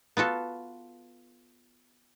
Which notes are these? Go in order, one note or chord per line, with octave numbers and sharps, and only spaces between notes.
B3 F4 F#4 A4